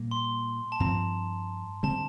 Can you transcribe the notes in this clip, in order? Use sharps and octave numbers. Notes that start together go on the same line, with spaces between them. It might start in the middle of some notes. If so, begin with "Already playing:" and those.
Already playing: A#2 G3 A#3
C6
A5
G2 F3 C4 A#5
D3 G3 C4 A5